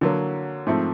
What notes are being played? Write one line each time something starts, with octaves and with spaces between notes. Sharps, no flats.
D3 F#3 A#3
G#2 F3 A3 C4